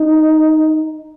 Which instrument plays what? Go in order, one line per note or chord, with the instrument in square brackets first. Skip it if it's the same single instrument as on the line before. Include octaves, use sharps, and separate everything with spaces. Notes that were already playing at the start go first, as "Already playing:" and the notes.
Already playing: [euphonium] D#4